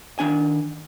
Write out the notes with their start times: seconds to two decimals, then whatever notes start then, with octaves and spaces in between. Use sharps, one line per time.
0.19 D#3 D4 G#5